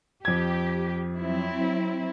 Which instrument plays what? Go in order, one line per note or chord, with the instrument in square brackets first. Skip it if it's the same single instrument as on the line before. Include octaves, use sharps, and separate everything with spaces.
[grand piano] F2 G#6 [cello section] G4
[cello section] F#3 C4 E4